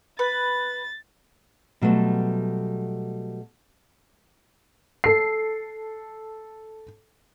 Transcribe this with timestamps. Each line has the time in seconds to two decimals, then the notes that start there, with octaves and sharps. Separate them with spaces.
0.19 B4 A6
1.81 B2 F#3 G3 A3
5.04 A4 C7